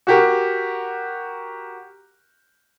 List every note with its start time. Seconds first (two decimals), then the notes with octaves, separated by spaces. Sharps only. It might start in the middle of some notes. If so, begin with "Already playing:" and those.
0.07 F#4 G4 A#4